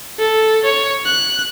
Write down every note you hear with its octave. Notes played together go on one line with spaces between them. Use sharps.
A4
C#5
F#6